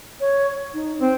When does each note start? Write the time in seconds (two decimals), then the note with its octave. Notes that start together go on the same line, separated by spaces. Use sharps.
0.21 C#5
0.74 D#4
1.00 C4 C5